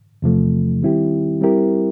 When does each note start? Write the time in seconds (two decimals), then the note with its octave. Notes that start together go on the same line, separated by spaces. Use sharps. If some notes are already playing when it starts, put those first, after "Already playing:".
0.22 E2 C3 F3 A3
0.83 D#3 G3 C4 E4 G4
1.41 G3 C4 E4 G4 A#4